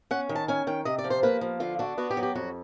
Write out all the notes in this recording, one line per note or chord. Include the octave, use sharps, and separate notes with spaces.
C#4 F#5
D#3
A5
C#4 G#5
D#3 G5
C3 D#5
D5
F3
C5
A#3 B4
F3
D3 F4
D4 F#4
B3 F#4
G4
F#3
G4
F2 F#4